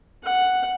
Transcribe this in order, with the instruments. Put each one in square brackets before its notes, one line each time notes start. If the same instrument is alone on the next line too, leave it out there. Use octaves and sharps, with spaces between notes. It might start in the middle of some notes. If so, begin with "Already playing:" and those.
[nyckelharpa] F#5